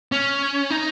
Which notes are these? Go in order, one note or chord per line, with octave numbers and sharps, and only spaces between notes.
C#4
D#4